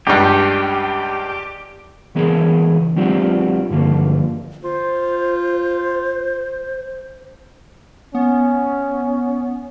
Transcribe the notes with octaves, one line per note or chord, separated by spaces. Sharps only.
C#2 G2 G4
C#2 E3 B3 G#4 A#4
F#3 G#3 C4 D4 F4 G4
G2 D3 F3 A#3
F4 C5
B3 C#4